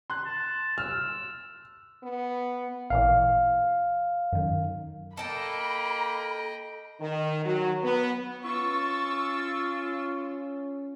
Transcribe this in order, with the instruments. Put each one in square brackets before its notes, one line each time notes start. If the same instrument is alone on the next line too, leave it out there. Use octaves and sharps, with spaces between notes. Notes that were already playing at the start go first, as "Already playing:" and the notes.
[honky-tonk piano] C6 F#6
[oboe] A5
[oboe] E6 [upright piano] F6
[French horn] B3
[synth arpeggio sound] A1 A#2 E3 [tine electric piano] F5
[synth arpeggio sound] F#2 D#3
[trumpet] A#3 [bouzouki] A4 A5 [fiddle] D#5 G5 [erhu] B5
[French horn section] D#3
F#3
B3
[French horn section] C#4 [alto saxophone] F4 [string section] C#6 E6 A6